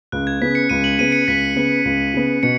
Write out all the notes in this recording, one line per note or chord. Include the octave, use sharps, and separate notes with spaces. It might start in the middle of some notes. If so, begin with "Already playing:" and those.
C#2 F#6
G#6
C#3 B3 B6
C#7
C#2 D#7
F#7
C#3 B3 D#7
C#7
C#2 B6
C#3 B3
C#2
C#3 B3
B2 C#7